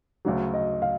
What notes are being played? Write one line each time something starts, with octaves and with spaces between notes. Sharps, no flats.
D2 C#3 F#3
D#5
F5